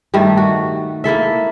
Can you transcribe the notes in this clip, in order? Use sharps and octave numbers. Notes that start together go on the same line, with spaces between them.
G2 D#3 G3 A3
F#4
A#3 E4 A4 E5